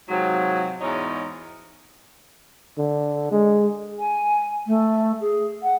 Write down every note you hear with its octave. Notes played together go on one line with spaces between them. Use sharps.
G#2 C3 F3 F#3
E2 G#2 C#4 D#4 C#5
D3
G#3
G#5
A3
G#4
F#5